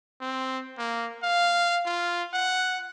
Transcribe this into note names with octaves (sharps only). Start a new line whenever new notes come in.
C4
A#3
F5
F4
F#5